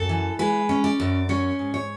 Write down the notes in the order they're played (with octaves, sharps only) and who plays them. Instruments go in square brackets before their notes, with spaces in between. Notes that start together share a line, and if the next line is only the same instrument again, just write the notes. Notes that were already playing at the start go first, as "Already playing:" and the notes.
Already playing: [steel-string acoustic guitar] F#2 A4
E3
G#3 B4
C#4
D5
F#2
C#4 C#5
G#2
C#5